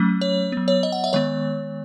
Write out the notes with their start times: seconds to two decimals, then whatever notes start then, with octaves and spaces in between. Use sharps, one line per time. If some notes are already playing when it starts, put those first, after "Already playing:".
Already playing: F#3 A3 C#4
0.21 C#5
0.52 F#3 B3
0.68 C#5
0.83 D#5
0.92 F#5
1.04 E5
1.13 D#3 G#3 B3 C#5